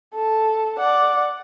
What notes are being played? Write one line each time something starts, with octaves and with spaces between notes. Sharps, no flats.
A4
D5 F#5